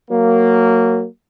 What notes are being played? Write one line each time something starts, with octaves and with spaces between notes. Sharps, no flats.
F#3 A#3